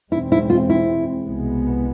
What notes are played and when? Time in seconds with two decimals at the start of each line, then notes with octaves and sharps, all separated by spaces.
0.12 E2 B2 G#3 C4 E4
0.32 E4
0.50 F4
0.69 E4
1.26 C2 B2 G#3 B3